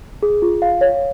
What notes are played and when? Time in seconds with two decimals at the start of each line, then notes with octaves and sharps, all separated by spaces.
0.23 G#4
0.42 F4
0.62 F5
0.81 C#5